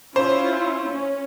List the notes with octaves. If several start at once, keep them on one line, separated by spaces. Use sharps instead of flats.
C#4 E4 F4 C5
C#4